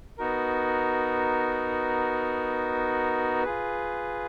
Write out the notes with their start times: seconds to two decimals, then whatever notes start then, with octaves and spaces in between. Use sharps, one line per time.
0.18 B3 D#4 F#4 A#4
3.43 F4 G#4 B4